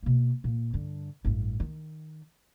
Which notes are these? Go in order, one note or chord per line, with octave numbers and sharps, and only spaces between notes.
B2 A#3
A#2
G2 D3
A1 G2
D#3